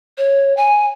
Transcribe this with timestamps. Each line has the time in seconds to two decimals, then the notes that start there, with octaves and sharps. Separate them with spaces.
0.18 C#5
0.57 G#5